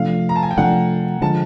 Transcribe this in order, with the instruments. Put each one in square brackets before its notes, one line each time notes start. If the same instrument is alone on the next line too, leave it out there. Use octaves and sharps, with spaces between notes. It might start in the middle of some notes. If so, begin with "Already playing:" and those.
Already playing: [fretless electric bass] C3 F3 A3 D4 [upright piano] F5
[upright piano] A#5
A5
G#5
G5
[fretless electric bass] C3 F3 A3 D4 [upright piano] F#5
[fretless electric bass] D3 F3 G#3 [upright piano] A5